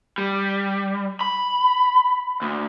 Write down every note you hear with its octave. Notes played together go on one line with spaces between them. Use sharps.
G3
B5
D2